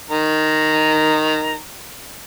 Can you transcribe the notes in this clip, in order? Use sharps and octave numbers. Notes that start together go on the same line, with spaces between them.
D#3 A#5